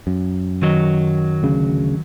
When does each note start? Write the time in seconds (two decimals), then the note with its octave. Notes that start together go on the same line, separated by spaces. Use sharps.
0.07 F#2
0.62 D#3 F#3 D#5
1.43 D2 C#3